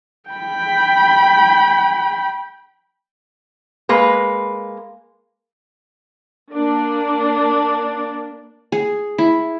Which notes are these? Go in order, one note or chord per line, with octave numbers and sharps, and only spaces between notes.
G5 B5
G#3 A#3 B4
A#3 D4
G#4
E4